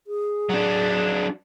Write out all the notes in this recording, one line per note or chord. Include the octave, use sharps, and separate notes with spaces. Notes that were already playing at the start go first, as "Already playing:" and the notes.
G#4
F#3 D4